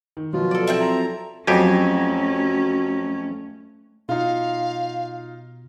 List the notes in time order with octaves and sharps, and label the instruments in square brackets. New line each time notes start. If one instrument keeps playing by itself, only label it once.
[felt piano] D#3
[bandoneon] B2 F4 [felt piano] F3 F#3
[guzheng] A4 D5
[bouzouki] C4 E4 E5
[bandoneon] A#5
[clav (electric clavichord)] F2 G4 G#5 [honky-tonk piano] F#3 [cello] A3 C#4
[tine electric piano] B2 [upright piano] D#4 F4 [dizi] F5